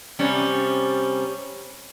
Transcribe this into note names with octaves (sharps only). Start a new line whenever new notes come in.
C3 G3 C#4